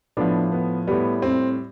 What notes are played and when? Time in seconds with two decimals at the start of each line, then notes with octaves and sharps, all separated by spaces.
0.17 A2 F3 B3 D4
0.52 B3
0.87 A2 G3 B3
1.22 C4